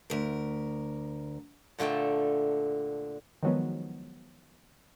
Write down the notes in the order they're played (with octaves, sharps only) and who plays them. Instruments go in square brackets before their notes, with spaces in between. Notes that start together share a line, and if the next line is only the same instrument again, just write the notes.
[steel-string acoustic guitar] D2 A#4
[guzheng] A#2 D3 A3 G5 A5
[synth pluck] D#3 F3 F#3 G#3 B3